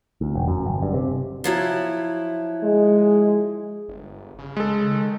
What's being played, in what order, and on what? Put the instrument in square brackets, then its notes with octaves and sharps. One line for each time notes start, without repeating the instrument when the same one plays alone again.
[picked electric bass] D2
E1
F#2
G1
G2
C3
[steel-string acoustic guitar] F3 F#3 E4
[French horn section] G#3
[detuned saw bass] G1
C#3
[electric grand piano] G#3 A4
[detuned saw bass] D#3